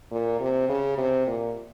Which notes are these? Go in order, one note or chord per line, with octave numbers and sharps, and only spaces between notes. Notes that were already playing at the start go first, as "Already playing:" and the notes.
A#2
C3
C#3
C3
A#2